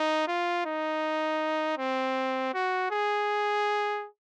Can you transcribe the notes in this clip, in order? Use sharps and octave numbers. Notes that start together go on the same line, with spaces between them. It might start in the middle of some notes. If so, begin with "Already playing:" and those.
Already playing: D#4
F4
D#4
C4
F#4
G#4